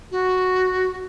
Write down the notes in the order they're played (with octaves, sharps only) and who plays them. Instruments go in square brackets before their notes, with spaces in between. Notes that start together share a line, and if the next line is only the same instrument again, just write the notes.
[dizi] F#4